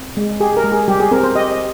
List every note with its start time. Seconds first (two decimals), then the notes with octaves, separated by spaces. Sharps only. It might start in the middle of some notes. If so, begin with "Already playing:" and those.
Already playing: C4
0.17 G#3
0.40 G4 G#4
0.57 A#4
0.64 G#3
0.72 G#4
0.88 G3 G4
1.00 G#4
1.11 C4 A#4
1.23 C5
1.35 G4 D#5
1.51 D#5